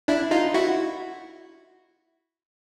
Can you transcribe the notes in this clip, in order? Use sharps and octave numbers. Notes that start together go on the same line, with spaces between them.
D4 E4
D#4 F4
E4 F#4